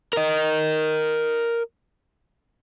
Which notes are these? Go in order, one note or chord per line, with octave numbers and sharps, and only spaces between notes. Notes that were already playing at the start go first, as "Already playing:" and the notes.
A#4 D#5